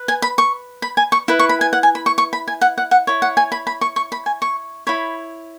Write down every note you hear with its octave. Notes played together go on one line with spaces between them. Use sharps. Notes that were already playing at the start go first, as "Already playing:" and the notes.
Already playing: B4
G#5
B5
C#6
B5
G#5
C#6
E4 B4
C#6
B5
G#5
F#5
G#5
B5
C#6
C#6
B5
G#5
F#5
F#5
F#5
E4 C#5
F#5
G#5
B5
B5
C#6
C#6
B5
G#5
C#6
E4 C#5 B5